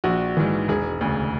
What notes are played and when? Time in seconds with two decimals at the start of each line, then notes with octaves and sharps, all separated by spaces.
0.04 A#1 F#4
0.37 G#2 E3
0.68 E1 G#4
1.01 D2 C#3